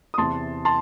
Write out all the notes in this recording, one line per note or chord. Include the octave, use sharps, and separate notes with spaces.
D#6
E2 C3 E3 A5 C6
A5 C6